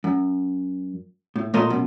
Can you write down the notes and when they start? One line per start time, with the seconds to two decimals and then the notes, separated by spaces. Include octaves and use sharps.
0.04 F#2
1.36 A2
1.54 A#2 A3 A#4 D#5 A5 C6
1.70 F#2 B2